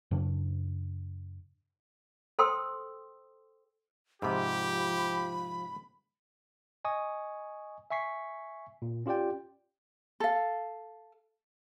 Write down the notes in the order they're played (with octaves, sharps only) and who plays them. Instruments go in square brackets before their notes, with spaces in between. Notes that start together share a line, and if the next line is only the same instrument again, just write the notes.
[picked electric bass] F#2 C#3 D4
[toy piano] A4 C5 G5 C6 D#6 E6
[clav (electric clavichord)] G#2 C3 [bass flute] F3 [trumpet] G4 [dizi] B5
[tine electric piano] D#5 G#5 C#6 D#6
E5 G#5 C#6 B6 C7
A#2
C#4 F4 G4 D5 G5
[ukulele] A4 F5